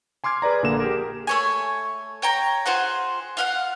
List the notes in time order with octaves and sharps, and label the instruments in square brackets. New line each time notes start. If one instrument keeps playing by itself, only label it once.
[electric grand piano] G#5 C6 D6 F6 G#6
G#4 B4 D5 A#5
A#1 D3 A#3 E7
G4 G#4 A#4
[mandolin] A3 C#5 G#5
C#5 G5 A#5
F4 G#4 C5 F#5
F4 F5 F#5